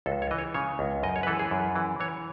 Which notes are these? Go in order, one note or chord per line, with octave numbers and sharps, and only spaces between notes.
C#2 A4
C#5
E3 D#5
C#5
C#3 C#5
C#2
F#2 D#5
C#5
B4
E3 A4
G#4
F#2
E3
E3 C#5